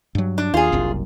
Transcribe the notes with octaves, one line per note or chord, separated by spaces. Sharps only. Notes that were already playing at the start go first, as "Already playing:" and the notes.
G2 F#3
D4
D#2 F4 G#4
F#1 C2 F#2